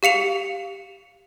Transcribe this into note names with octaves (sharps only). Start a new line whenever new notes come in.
G4 F5 C#7 F7